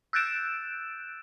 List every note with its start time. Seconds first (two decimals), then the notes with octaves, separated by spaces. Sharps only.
0.13 E6 F#6 G6 A6 D7 E7